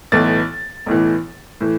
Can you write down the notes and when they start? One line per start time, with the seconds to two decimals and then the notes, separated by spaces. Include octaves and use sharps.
0.12 B1 A2 E3 A6
0.86 B1 A2 E3
1.61 A2 E3